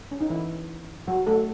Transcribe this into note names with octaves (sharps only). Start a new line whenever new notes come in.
C#4
D#4
E3 E4
F#3 F#4
A3 A4